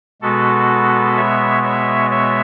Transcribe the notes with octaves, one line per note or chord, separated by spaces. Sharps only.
B2 G#3 B3 F#4 A4
C#5 E5
C#5 E5
C#5 E5